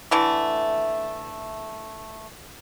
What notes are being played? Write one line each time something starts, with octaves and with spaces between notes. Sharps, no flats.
D3 E3 A3